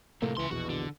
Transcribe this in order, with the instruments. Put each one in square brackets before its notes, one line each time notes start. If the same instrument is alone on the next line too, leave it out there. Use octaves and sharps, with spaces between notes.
[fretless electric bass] A2 A3 A#3 [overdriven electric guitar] C3 F3
[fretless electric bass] C#2 E3 [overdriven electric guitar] C#3 C6
[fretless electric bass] A#1 E2 B2 [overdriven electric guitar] F#4
[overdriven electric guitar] D3